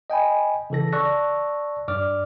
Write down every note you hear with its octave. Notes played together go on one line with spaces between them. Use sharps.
D#5 G5 G#5 B5
C#3 E3 A4 A#6
D5 A5 C#6 E6 F#6 A#6
G2 D5 D6 F6